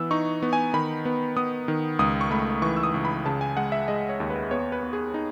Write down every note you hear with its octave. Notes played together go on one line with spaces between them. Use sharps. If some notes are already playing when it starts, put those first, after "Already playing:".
Already playing: E3 B3 E6
D#4 C#6
B3
G#5
D#3 B5
B3
B3 D#6
D#3
C#2 D#6
C#6
A3 B5
E3 C#6
E6
D#6
C#2
B5
C#3 A5
G#5
G#3 F#5
E5
G#3 D#5
C#5
D#2
B4
B3 C#5
B4
B3
G#4
D#4